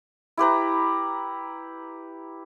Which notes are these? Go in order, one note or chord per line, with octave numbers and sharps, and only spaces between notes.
E4 G4 B4 A#5